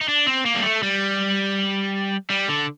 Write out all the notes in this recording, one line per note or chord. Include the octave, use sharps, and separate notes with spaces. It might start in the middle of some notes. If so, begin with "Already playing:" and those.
D#4
D4
C4
A#3
G3
A3
G3
G3
D3